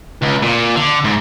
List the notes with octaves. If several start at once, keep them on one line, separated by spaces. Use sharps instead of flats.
C#2
A#2
D3
G#2